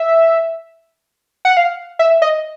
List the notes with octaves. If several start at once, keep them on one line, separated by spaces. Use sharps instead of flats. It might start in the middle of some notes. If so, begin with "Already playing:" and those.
Already playing: E5
F#5
F5
E5
D#5